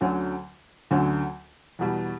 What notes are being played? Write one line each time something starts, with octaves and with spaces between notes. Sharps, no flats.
D2 D3 F#3 C#4
D2 D3 F#3 C#4
E2 B2 G3